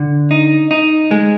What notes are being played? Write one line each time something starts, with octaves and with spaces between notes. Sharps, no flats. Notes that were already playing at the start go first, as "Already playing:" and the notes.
Already playing: D3
D#4
D#4
G#3